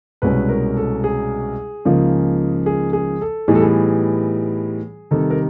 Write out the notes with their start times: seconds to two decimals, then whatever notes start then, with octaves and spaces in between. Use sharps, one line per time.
0.22 C2 B2 G#3 C#4 B4
0.49 A#4
0.77 A4
1.04 G#4
1.85 C#2 C#3 F3 A#3 D#4
2.66 G#4
2.93 G#4
3.21 A4
3.48 A2 E3 G3 B3 D#4 G#4
3.55 A4
3.63 G#4
5.11 C3 D#3 G3 A4
5.31 A#4